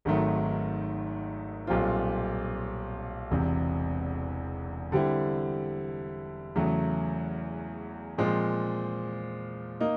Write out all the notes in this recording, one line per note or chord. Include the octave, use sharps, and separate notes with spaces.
G#1 G#2 D#3 F#3 A3
B1 A#2 G3 C4 F4
E1 E2 C3
D3 G3 C4 E4
E2 C#3 F#3 A3
A#2 F3 G#3 C4
A#3 D#4